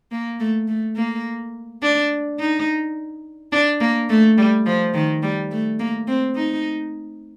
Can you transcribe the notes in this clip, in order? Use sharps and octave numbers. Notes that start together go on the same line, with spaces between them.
A#3
A3
A3
A#3
D4
D#4
D4
A#3
A3
G3
F3
D#3
G3
A3
A#3
C4
D#4